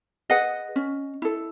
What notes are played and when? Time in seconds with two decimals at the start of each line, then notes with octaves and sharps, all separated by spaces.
0.30 G#4 B4 D#5 F#5
0.76 C#4
1.22 E4 A4